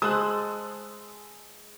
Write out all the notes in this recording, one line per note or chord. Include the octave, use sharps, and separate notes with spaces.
G#3 C5 A5 D#6 E6 F#6